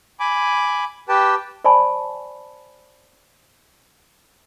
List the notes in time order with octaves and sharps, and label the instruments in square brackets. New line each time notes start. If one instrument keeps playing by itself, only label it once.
[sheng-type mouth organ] G#5 B5 D6
G4 B4 G5 A5
[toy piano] C5 D5 G#5 A5 B5 C#6